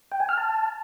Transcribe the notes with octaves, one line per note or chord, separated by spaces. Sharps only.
G5
G#5
F6
A5